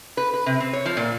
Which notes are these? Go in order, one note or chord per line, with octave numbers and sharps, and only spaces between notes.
B4
B4
C3
C4
C#5
F3
A#2